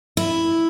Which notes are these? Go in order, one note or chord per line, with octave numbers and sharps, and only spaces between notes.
E4